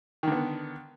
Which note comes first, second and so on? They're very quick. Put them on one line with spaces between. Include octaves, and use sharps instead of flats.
D#3 D3 B3